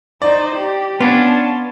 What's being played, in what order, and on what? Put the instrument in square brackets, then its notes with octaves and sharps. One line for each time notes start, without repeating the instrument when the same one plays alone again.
[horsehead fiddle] D#4 C5 [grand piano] D5
[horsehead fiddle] G4
[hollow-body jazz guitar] B3 [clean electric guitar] C#4 D4 F4 [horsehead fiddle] A5